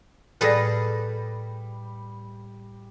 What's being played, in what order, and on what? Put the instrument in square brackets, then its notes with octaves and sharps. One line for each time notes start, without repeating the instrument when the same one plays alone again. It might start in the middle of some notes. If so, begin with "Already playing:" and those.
[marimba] A2 A#6 [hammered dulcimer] G3 [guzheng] G#4 A4 B4